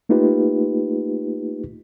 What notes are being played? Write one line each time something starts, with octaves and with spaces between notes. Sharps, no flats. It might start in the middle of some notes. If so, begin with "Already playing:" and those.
A3 A#3 D#4 F4 G4 B4